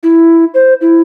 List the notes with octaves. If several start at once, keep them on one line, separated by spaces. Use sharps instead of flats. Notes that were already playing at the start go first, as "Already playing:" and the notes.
E4
C5
E4